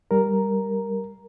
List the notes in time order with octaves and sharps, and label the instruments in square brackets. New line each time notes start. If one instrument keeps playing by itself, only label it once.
[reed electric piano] G3 A#4